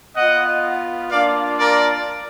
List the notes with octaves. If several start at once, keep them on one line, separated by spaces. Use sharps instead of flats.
B3 F4 D#5 F#5
A#3 D4 F4 D5 F5
A#4 D5